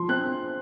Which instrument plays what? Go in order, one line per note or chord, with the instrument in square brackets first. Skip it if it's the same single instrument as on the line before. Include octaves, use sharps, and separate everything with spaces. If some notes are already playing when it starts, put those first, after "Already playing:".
Already playing: [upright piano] F3 C6
C4 F#6